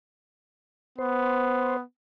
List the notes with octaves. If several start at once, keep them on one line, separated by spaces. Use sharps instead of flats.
B3 C5